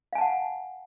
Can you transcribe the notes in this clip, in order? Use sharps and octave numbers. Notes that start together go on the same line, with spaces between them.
F5 F#5 G#5 A5